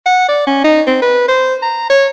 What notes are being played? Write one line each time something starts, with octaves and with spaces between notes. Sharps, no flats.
F#5
D5
C#4
D#4
C4
B4
C5
A#5
C#5